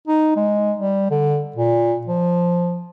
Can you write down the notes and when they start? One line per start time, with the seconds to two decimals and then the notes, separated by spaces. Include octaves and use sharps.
0.08 D#4
0.36 G#3
0.79 G3
1.11 D3
1.56 A#2
2.07 F3